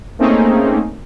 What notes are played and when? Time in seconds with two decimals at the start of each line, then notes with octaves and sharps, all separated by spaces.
0.19 A3 A#3 C4 C#4 D#4 G#4